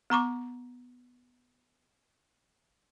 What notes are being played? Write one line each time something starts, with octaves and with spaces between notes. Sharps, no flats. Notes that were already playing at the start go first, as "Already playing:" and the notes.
B3 A#5 C#6 D6